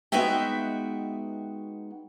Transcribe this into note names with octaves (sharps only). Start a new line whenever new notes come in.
G#3 B3 D#4 F#4 E5 G5